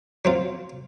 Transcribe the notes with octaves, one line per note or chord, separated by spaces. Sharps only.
F#3 C4 F4